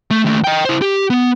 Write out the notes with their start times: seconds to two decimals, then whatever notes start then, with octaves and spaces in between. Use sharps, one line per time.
0.11 A3
0.25 D#2 A3
0.44 D#5 G5
0.65 E4 C5
0.82 G4
1.10 B3